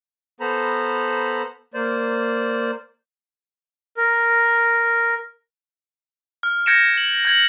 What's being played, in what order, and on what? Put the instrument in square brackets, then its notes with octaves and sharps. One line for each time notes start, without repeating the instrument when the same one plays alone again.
[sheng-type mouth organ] B3 A4 C5 A#5 B5
A#3 C5 D5
A#4
[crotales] F6
G6 G#6 A#6 C#7 D7 E7
F#7
G6 G#6 F#7